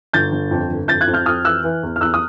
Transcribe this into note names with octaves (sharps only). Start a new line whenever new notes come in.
G1 G6 A6
G1
F2
G1
F2 G6 A6
F#6 G#6
F2
F6 G6
F2 D#6 F6
E3 E6 F#6
E3
E2
F6
E2 E6 F#6
D#6